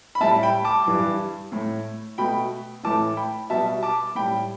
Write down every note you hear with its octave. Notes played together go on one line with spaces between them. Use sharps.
B5
A2 G3 E5 A5
G5 B5
A5 D6
G2 E3 G3
A2 A3
B2 A3 G5 B5
A2 E3 A3 A5 D6
G5 B5
B2 G3 E5 A5
A5 D6
A2 G3 G5 B5